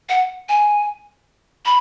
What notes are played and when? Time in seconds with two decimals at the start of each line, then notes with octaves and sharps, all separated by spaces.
0.09 F#5
0.48 G#5
1.65 B5